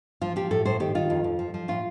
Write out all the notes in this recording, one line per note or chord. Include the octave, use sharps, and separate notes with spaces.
F3 F4
F3 G4
A2 A4
A2 C5
D#3 G4
D#3 F4
F2
F2
F3
F3
A2 F4